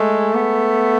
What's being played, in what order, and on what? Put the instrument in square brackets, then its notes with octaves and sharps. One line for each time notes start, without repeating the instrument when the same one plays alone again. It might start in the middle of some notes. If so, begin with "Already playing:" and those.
Already playing: [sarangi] G#3 [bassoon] A3
[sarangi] B3